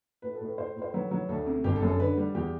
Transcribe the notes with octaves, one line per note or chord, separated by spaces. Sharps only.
A2 B4
A4
A2
B4
A2 C5
A2
C5
F#3 B4
F#3
D2 A4
C3
G1 G4
A4
F#2
A4
D3 B4
G3
E2 G4